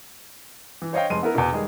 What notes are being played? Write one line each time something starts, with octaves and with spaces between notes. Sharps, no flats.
E3
C5 C#5 D#5 F5 G5
F1 G#3 D#4 C6 D#7
B3 E4 A#4
E2 B2
D#3 G3 G#3 G#4